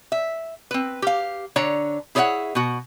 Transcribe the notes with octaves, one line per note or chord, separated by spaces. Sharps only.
E5
C4 B4
G4 F5
D3 D4 C#5 A#5
E4 G#4 C#5 D5 E5 F#5
B2 F#4